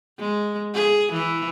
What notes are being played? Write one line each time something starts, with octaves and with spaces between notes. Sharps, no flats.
G#3
G#4
E3